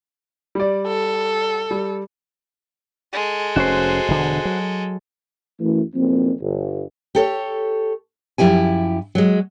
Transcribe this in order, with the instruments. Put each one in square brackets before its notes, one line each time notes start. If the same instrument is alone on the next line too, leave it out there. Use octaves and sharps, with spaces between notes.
[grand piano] G3 D5
[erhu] A4
[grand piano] G3
[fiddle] G#3 A4
[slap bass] F1 C#4 [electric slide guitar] F#4 C5
[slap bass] E1 D3
F#3
[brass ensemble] F#2 E3 A3
F#1 B1 F3 A#3 C4
G1
[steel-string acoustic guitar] G4 A4 C#5
F#2 F3 E4 G4 G#5
F#3 G#3